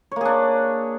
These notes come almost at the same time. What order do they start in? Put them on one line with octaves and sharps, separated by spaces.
C#5 A#3 G#4 D4